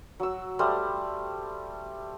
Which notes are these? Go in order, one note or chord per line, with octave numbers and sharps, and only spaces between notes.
F#3 E6
G3 A3 C5